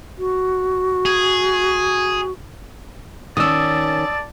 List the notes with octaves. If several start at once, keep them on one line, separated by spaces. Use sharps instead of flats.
F#4
G#4
D#3 C#4 D5 A5 D#6 E6